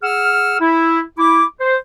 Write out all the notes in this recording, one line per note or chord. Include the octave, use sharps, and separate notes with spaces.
G#4 F#5 E6 F6
E4
E4 D6
C5